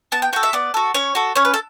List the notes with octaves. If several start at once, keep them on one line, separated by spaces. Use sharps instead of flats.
B3 A5
G5
F#4 A4 G5
E5
B3 D5
F#4 A4
C#4 C#5
F#4 A4
C#4 C#5
B4
A4